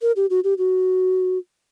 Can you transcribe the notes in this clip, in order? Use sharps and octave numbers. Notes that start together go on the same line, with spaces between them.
A#4
G4
F#4
G4
F#4